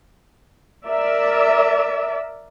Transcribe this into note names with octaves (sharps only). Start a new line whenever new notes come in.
A#4 D5 E5